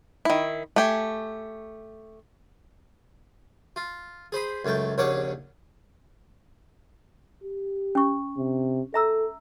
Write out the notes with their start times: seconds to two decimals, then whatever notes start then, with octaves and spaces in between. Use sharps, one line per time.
0.25 D#3 E4
0.76 A3 G4 G#5
3.76 F4
4.32 G#4 C5 B5 D#6
4.65 C#2 F#2 A3 G5
4.98 A#1 D#2 C#3 C#5 F#5 D6
7.44 G4
7.95 C#4 C#6
8.37 C3
8.94 A4 E5 A#5 E6